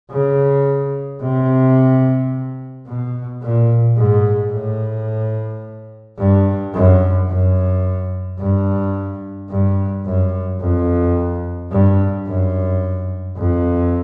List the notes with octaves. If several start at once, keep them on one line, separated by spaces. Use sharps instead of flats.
C#3
C3
B2
A#2
G#2
A2
G2
F#2
F#2
G2
G2
F#2
F2
G2
F#2
F2